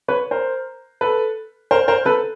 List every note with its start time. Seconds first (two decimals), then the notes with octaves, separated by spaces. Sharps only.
0.08 B4 C#5
0.31 A#4 C5
1.01 A4 B4
1.71 A#4 C5
1.88 A#4 C5
2.05 A4 B4